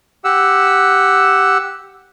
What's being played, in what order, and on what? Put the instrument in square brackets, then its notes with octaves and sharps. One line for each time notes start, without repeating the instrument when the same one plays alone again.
[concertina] G4 F#5 E6